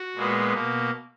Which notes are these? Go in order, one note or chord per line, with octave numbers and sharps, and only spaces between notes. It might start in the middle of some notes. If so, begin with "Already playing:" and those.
Already playing: F#4
A#2 G#3 B3
B2 A#3